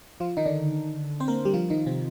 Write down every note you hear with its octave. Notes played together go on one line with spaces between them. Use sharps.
F3 F4
D#3 D#4
D3 D4
C4 C5
A#3 A#4
G3 G4
F3 F4
D#3 D#4
C3 C4